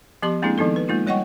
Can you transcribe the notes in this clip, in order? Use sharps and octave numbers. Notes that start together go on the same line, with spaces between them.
F3 B3 G4 C6 D6
G#3 A#3 C4 D4 E4 G#4
D#3 F3 B3 D#4 A4
B4
G#3 A#3 D#4 F4
G3 C#5 D#5 F#5 G5 C#6